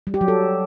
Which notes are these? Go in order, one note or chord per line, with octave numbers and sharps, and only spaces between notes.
G3
G4
F#3
A4